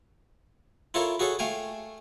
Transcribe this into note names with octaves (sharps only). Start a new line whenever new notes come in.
E4 F4 A4 A#4 C#5
F#4 G#4 A4 C#5
A3 F5 G5 G#5